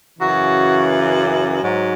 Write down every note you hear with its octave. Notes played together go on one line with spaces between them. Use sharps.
F#2 C#3 E3 F#4
G#2 F#3